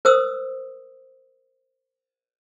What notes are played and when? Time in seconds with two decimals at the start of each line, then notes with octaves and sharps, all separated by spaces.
0.05 A#4 C5 D#6 E6